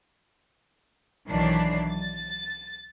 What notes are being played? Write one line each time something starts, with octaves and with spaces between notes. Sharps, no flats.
B1 D#3 E3 F#3 D4 C7
A6